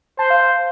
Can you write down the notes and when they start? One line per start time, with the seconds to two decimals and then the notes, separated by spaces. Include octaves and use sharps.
0.18 C5 A5
0.30 F5